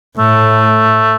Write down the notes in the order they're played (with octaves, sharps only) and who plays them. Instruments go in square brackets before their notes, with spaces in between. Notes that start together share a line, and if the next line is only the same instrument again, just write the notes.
[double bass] A2 [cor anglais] A3